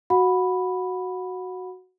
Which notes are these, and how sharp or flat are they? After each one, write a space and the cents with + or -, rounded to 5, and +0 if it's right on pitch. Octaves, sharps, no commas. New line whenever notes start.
F#4 +0 F#5 -30 B5 +0